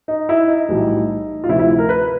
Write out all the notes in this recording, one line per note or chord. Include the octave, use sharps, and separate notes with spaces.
D#4
E4
D#4
B1 A2 E3 G3
F4
D2 C3 F3 E4
E4
A#4
B4